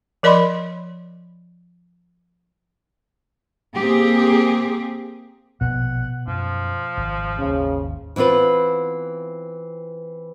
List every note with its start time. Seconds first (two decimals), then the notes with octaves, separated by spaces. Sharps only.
0.23 F3 A#4 D5 D#5 B5 C6
3.77 A#3 C4 G4 G#4
5.61 A#1 B2 F#5
6.27 F#2 F3
6.97 G#1
7.39 G#1 D#2 C#3 C#4
8.16 E3 B3 C4 F4 B4